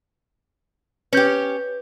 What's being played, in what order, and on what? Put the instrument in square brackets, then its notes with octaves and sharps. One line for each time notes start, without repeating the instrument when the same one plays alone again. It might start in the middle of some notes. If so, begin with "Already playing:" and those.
[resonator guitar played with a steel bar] C#4 G4 [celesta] B4 G6